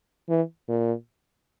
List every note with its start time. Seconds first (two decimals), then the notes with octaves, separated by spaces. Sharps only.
0.29 E3
0.69 A#2